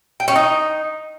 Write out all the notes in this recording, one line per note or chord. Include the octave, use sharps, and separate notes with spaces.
G5
C#4
D#4